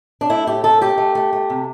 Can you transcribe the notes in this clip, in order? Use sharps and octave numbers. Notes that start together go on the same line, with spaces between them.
D4
A3 E4
A2 G4
A3 A4
A3 G4
A3
A3
A3
C3